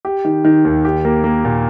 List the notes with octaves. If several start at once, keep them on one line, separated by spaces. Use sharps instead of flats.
G4
D#3
D#3
D#2
G4
A#3
A#3
A#2